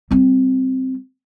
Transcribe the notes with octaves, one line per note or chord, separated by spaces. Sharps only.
G3 C4